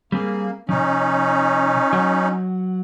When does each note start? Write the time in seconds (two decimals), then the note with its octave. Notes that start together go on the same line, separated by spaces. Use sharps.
0.12 G3 A#3 C4 G#4
0.69 C3 F3 C#4 D#4
1.93 F#3 F#5